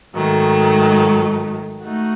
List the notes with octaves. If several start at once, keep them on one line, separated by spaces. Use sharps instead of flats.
G#2 D#3 F#3 A3
A3 D#4 F#4